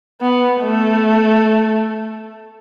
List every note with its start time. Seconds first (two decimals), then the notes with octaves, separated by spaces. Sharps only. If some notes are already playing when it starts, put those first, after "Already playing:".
0.21 B3
0.61 A3